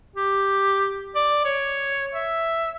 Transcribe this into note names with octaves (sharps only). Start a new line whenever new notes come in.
G4
D5
C#5
E5